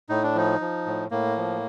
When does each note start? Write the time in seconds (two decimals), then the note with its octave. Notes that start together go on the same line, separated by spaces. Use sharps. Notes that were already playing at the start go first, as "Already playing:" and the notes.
0.09 A2 D#4
0.23 D4
0.35 F3 D#4
0.61 F3
0.86 A2
1.11 A2 A#3
1.37 F3